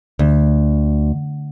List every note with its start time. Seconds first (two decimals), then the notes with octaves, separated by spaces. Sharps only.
0.19 D2